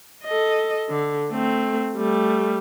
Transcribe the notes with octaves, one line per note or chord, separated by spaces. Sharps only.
A4 D#5
D3
A3 C4
G3 A3